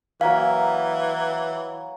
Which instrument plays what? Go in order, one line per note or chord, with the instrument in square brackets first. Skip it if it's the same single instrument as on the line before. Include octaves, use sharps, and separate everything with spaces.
[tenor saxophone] E3 [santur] F#3 A#3 G#5 [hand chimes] F5